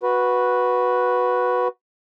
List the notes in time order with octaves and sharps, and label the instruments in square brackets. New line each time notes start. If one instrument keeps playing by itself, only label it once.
[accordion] F#4 B4